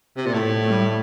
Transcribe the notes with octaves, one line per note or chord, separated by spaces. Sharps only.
C3
A#2
A2 A3
A3
G3
A3